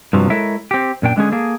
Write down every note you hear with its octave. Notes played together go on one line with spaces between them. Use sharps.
G2 C3 F3 F#3
G#3 E4 A4 A#4 C#5 E5
C4 G4
F#2 A#2 D4 G5
D3 G#3 C#4 G#4
A#3 G#4 A4